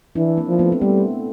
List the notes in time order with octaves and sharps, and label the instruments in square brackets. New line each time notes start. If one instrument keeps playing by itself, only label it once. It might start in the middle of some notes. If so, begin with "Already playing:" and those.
[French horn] E3 [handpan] D4 E4
[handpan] A#3 C4
[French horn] F3
[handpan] A3 B3
C4
[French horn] G3 [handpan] A3 B3